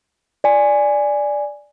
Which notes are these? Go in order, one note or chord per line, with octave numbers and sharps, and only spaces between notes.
D5 G#5